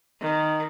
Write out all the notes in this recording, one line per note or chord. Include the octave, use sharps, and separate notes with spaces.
D#3